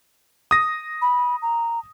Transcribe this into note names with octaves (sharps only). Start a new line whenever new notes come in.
D#6 A#6
B5
A#5